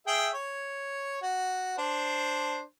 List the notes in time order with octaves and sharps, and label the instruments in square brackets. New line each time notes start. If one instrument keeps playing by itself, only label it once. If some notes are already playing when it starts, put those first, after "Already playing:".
[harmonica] G#4 E5 G5
C#5
F#4
D4 C5